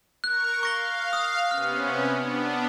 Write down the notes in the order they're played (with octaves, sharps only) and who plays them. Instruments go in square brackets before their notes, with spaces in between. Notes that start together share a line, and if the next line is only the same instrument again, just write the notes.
[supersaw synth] A#4 C#6 [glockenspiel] F#6
[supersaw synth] F5 [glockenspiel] C#6 A#6 G7
[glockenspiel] D#6
[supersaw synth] C3 B3 C#4 [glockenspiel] F6
[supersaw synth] B3 D4